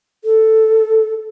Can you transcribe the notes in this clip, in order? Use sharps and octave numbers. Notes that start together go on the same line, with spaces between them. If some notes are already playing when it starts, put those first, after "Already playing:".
A4